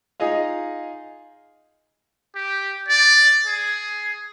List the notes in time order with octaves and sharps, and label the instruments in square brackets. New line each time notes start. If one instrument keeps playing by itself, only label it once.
[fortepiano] D#4 F4 G#4 D#5 F5
[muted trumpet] G4
D5
G#4